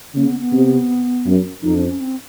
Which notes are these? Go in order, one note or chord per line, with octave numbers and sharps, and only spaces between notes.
C#3 A#3
B3
B3
C3
F#2
F2 D#4
D4
C#4
C4